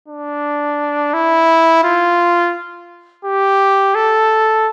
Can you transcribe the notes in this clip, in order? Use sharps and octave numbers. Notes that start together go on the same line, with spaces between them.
D4
E4
F4
G4
A4